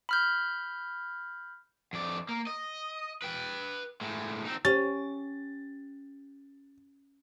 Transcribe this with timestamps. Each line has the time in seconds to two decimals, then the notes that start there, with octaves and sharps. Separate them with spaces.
0.09 B5 F6 G6
1.93 F2 D5
2.29 A#3
2.47 D#5
3.22 B4 G5
4.01 A2 G#3
4.45 C4 D#4
4.65 C#4 G4 A6